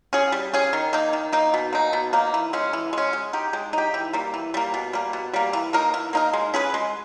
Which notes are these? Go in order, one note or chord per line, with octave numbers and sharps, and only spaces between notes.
C#4 G#4
G3
C#4 G#4
D#3
A#3 D#4
D#3
A#3 D#4
B2
A#3 D#4
B2
A#3 D#4
E3
G#3 C#4
E3
G#3 C#4
G#3
D#4 G4
G#3
D#4 G4
E3
G3 A#3
E3
G3 A#3
B2
G3 A#3
B2
G3 A#3
E3
A#3 D#4 A#4
E3
A#3 D#4 A#4
G#3
C#4 G#4 B4
G#3